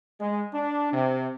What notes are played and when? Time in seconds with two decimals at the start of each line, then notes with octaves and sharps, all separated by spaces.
0.20 G#3
0.54 D4
0.92 C3